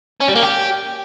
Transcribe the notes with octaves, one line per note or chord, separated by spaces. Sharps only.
C#4
G3
A#3
G4